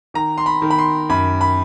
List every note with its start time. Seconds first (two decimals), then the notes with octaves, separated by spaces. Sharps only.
0.14 D#3 A#5
0.38 C6
0.46 B5
0.62 D#3
0.70 B5
0.78 C6
1.09 F#2 B5
1.41 B5